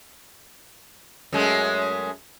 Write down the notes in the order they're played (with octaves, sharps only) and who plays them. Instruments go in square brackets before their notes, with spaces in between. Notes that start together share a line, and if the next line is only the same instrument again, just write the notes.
[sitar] F#2 G#3 A3